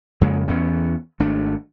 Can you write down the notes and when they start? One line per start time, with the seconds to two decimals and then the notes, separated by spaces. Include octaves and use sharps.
0.21 F2 C#3 G#3 A#3
0.48 E2 E3 B3 C#4
1.20 G#1 A3 D4